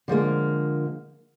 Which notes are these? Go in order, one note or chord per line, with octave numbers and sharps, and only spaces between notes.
D3 F3 G#3 A#3